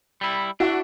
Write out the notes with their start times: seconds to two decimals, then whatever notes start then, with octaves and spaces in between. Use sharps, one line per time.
0.21 G3 E4
0.60 D4 E4 F#4